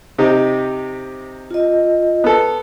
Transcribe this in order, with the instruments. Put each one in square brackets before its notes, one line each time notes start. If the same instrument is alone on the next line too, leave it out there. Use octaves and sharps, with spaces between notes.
[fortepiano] C3 D#4 G4
[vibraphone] F4 D#5
[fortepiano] B3 A4